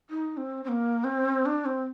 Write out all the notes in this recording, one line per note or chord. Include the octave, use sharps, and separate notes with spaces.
D#4
C4
C4
A#3
C4
D4
C4